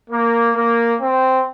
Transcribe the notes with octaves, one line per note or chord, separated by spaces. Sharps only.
A#3
A#3
C4